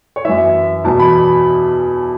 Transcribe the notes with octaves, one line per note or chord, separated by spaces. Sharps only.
C#5
F#2 E3 E5
E2 B2 F#3 A5
B5